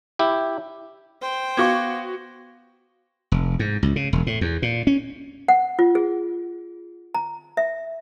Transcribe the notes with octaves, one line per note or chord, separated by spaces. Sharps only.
E4 G4
C5 G5
B3 F#4 F5 C#6 D6 G#6
F1
G#2
C#2
C#3
E1
A2
E2
A#2
C#4
F#5
F4
G#4
A#5
E5